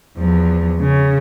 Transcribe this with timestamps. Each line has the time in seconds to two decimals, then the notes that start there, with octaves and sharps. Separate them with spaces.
0.18 E2 F3
0.80 C#3